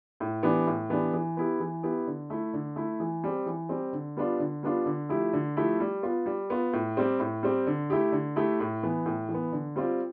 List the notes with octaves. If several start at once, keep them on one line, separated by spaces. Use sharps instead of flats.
A2
E3 B3 D4 G4
A2
E3 B3 D4 G4
E3
B3 E4 G4
E3
B3 E4 G4
D3
A3 E4
D3
A3 E4
E3
G3 C4
E3
G3 C4
D3
G3 B3 D4 F4
D3
G3 B3 D4 F4
D3
F3 A3 E4 G4
D3
F3 A3 E4 G4
G3
B3 F4
G3
B3 F4
A2
G3 C4 G4
A2
G3 C4 G4
D3
A3 E4 G4
D3
A3 E4 G4
A2
E3 B3
A2
E3
B3
D3
G3 C4 F4